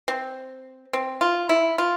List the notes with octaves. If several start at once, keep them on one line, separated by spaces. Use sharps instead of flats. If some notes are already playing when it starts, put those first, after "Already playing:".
C4
C4
F4
E4
F4